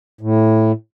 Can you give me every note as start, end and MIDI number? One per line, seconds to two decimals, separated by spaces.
0.21 0.72 45